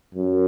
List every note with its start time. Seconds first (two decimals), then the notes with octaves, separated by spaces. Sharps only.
0.15 F#2